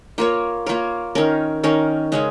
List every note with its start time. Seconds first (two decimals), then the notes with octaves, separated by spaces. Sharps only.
0.18 A#3 F4 A#4 C#5
0.66 A#3 F4 A#4 C#5
1.15 D#3 C#4 A#4
1.64 D#3 C#4 A#4
2.12 C#3 G#3 C#4 G#4